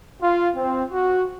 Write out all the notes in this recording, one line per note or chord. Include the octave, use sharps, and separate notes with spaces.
F4
C4
F#4